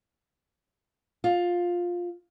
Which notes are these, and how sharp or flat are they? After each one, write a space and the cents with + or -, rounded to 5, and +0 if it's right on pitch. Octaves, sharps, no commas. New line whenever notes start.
F4 +10